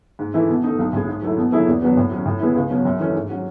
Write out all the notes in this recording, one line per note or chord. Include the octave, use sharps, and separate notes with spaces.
G#2
E3 A3 E4
B2
A3 D#4
B1
A2 G#3
G#2
F#3 A3 E4
B2
F#3 A3 E4 G#4
E2
B2 F#3 B3 F#4
A2
F#3 C#4
A2
G#3 B3 E4
C#2
B2 F#3 C#4 F#4
F#2
E3 A3 C#4
G#2
F#3 C#4 F#4